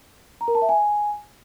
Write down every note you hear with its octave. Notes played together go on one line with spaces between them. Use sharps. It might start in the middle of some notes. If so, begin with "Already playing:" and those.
A#5
A#4
A5
E5
G#5